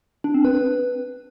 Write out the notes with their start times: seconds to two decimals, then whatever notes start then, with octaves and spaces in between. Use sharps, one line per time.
0.24 D4
0.34 C4
0.45 B4
0.55 B4